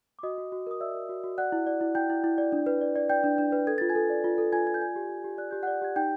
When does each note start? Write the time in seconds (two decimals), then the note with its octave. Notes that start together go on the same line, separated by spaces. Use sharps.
0.19 D6
0.23 F#4 D#5 D#6
0.38 F#4
0.52 F#4
0.67 A#4 D#6
0.80 D5 E5 E6
0.95 A#4
1.09 F#4
1.24 F#4
1.38 D5 F#5 F#6
1.52 E4
1.67 D5
1.81 E4
1.95 E4 G5 G6
2.10 E4
2.24 E4
2.38 D5
2.52 D4
2.66 B4
2.81 D5
2.96 D5
3.09 D5 G5 G6
3.24 D4
3.38 D4
3.52 B4
3.67 A4 G#6
3.78 F4 A6
3.89 G#5 G#6
3.95 A4
4.10 D5
4.24 F4
4.38 A4
4.53 F4 G#5 G#6
4.67 F4 G#6
4.74 G6
4.81 D5 G#5 G#6
4.96 G4
5.10 G4
5.24 G4
5.38 D5 F#6
5.51 G4 G6
5.63 D5 F#5 F#6
5.82 G4 G#6
5.96 D#4 G5 G6